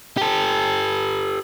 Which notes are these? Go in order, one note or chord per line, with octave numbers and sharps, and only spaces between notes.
G4 A4